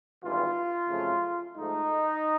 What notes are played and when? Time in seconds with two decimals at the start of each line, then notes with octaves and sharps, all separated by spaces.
0.22 G#1 G2 E3 F4
0.89 F2 C#3 F#3 A3
1.55 G#2 F3 A3 D#4